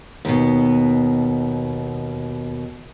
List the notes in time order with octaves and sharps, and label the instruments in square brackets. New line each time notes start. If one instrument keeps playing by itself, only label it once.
[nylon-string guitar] D#2 B2